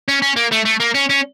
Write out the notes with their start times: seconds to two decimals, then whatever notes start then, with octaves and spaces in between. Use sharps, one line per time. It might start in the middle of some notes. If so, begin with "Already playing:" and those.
0.08 C#4
0.22 C#4
0.36 A#3
0.52 A3
0.65 A3
0.80 A#3
0.95 C#4
1.10 C#4